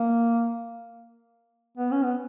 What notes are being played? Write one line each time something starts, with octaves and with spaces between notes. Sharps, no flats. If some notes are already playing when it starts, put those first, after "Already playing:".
Already playing: A#3
B3
C#4
B3